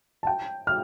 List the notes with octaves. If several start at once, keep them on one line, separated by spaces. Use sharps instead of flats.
A5
G5
F6